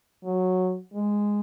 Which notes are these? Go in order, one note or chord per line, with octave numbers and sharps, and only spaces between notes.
F#3
G#3